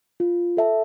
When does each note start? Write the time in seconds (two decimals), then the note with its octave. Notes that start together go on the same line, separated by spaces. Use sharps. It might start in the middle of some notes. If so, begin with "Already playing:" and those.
0.20 F4
0.57 A4 E5 A5